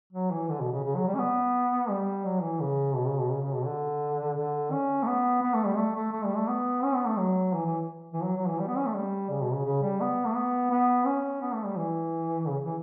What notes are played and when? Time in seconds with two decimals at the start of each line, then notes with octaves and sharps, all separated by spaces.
0.13 F#3
0.31 E3
0.49 D3
0.61 B2
0.72 C#3
0.85 C#3
0.96 F#3
1.08 G3
1.15 C#4
1.19 B3
1.90 G3
2.25 F#3
2.43 E3
2.60 C#3
2.95 B2
3.07 C#3
3.19 B2
3.31 C#3
3.42 C#3
3.55 B2
3.67 D3
4.37 D3
4.72 C#4
5.03 A3
5.07 B3
5.42 B3
5.54 A3
5.66 G3
5.77 A3
5.96 A3
6.13 A3
6.25 G3
6.37 A3
6.48 B3
6.84 C#4
6.95 B3
7.07 A3
7.18 F#3
7.54 E3
7.66 E3
8.14 E3
8.24 F#3
8.37 F#3
8.49 E3
8.60 G3
8.68 B3
8.77 C#4
8.86 A3
8.96 G3
9.30 C#3
9.42 B2
9.53 C#3
9.66 C#3
9.83 G3
10.01 B3
10.26 A3
10.36 B3
10.71 B3
11.06 C#4
11.42 B3
11.54 A3
11.65 G3
11.77 E3
12.47 C#3
12.66 E3